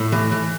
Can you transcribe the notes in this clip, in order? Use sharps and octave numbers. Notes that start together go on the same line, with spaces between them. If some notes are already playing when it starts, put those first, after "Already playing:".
Already playing: A2
E3
E3